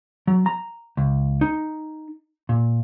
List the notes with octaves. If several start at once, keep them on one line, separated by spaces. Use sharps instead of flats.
F#3
A#5
C#2
D#4
A#2